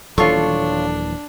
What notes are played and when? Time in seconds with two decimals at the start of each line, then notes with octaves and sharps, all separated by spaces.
0.18 D#1 E3 F#3 D4 F4 A4 C#5 C#6